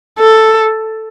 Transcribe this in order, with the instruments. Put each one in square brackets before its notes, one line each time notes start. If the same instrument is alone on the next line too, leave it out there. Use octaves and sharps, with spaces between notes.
[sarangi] A4